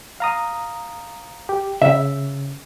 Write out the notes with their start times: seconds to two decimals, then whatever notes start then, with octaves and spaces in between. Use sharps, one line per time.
0.20 F5 A#5 D#6
1.49 G4
1.82 C#3 E5